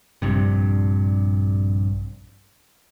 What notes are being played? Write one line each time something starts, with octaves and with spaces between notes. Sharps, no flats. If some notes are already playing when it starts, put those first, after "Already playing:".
A#1 G2 C3